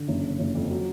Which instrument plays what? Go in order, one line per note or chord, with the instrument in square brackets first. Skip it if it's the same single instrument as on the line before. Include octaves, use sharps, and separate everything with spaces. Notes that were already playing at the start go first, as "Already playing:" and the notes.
Already playing: [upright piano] D3
F#1
C#3
F#1
F2
F#3